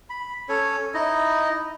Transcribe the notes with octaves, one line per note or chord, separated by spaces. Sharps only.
B5
C#4 A4 C#5
D#4 E4 D#5